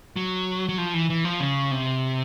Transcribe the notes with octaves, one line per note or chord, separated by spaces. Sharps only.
F#3
F#3
F3
E3
E3
F3
C#3
C3